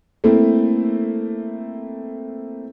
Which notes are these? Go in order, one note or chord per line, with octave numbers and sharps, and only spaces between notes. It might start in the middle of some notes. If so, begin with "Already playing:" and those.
A3 A#3 C4 E4